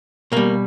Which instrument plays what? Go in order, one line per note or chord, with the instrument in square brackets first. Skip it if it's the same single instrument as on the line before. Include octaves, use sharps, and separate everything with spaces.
[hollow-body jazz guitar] B2 G3 A#3